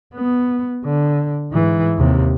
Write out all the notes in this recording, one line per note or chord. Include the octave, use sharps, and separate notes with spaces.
B3
D3
G#2 E3
D#2 C3